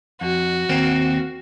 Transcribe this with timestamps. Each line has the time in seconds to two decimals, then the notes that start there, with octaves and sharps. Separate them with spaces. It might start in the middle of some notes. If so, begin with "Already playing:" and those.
0.21 F2 F#4
0.69 D#2 A#3 C4